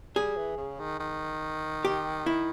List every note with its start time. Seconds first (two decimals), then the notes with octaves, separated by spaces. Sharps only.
0.16 G3 G#4
0.37 E3
0.57 C#3
0.79 D#3
1.00 D#3
1.85 G4
2.26 E4